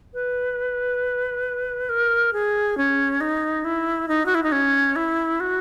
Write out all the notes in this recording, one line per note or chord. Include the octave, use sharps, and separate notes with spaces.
B4
A#4
G#4
C#4
D#4
E4
D#4
F#4
E4
D#4
C#4
E4
F#4